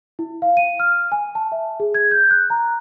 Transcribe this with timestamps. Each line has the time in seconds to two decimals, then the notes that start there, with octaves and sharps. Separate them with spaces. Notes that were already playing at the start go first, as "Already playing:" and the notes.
0.19 E4
0.42 F5
0.57 D#7
0.80 F6
1.12 G#5
1.35 A5
1.52 E5
1.80 G#4
1.94 G#6
2.11 G6
2.31 F#6
2.50 A#5